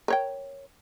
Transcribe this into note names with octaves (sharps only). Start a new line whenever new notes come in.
A#4 C#5 G5